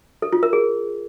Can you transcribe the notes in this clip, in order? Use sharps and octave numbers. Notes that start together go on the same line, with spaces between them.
A4
F4
A#4
G#4